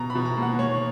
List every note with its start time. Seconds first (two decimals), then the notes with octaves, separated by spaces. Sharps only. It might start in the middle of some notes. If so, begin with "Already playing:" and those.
Already playing: B2 A#5
0.10 B5
0.15 B2
0.25 A#5
0.37 A#3
0.42 F#5
0.59 A#3 C#5